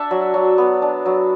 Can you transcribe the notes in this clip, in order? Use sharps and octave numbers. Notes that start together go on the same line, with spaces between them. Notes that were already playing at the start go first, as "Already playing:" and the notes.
Already playing: D4 E5 F#5 A5
F#3
F#3
B3
D4
F#3